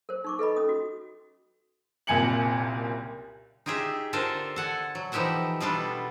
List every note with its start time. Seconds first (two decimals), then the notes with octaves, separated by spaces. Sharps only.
0.09 A#4 C5
0.24 D#4 C#6 D6
0.39 A4 B4 D#5 B5
0.56 C#4 D#6
0.69 F#4
2.07 F#1 C2 A#2 G#5 C#7 F#7
3.66 D#4 F4 G4 G#4 E5
4.13 D3 D4 F4 A4 A#4 C5
4.56 A4 F#5 G#5
4.95 F#3
5.12 E3 F3 D#4 G4 E5 F#5
5.60 B2 G3 B3 D4 F4 A4